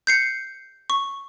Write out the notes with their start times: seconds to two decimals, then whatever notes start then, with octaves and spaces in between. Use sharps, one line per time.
0.07 G6 C7 C#7
0.90 C#6